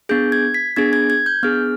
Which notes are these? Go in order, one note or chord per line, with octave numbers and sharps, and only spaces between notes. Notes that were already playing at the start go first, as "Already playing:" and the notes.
B3 D4 G#4 G6
G#6
B6
B3 D4 G#4 G#6
G#6
G#6
G6
B3 D4 G#4 F6